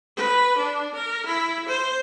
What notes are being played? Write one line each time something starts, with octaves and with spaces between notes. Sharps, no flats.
B4
D4
A#4
E4
C5